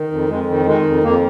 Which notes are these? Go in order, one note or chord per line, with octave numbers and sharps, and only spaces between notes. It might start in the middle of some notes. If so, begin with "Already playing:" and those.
Already playing: D#3
F2
F2 G#3
D#3
D#3 G#3
F2
F2 A#3